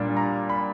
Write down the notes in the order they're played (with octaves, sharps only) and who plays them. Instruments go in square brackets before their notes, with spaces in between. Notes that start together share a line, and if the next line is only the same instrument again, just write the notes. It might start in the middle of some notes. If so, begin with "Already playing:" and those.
Already playing: [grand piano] A#2 G3 D4
A#5
B5